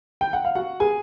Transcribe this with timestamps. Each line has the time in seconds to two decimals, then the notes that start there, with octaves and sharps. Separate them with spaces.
0.21 G5
0.33 F#5
0.45 F5
0.55 F#4 F#5
0.80 G#4 G#5